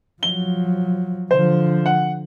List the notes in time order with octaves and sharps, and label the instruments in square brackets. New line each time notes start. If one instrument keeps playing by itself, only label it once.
[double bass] F3 F#3 [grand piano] G7
[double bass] D3 F3 [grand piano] C5
[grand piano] F#5